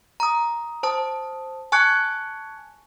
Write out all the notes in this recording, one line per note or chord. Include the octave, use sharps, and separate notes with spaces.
A#5 D#6
C5 A5 D#6
G#5 A5 C#6 F#6 G#6 C#7